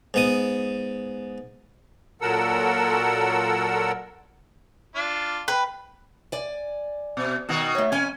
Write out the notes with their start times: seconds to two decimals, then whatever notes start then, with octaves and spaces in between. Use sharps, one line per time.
0.14 G#2 B3 D#6
2.21 A#2 F#3 A4 A#4 F#5 E6
4.96 D4 F4
5.48 B4 G5
6.32 D5 G#5
7.17 B2
7.49 B2 D#3 F#4
7.75 A3 C#5
7.92 F2 C#4 G#5